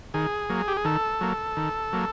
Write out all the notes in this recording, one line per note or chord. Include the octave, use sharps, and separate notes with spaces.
D#3 G#4
F#3 A#3
G4
G#4
D#3 A4
F#3 A#3
D#3
F#3 A#3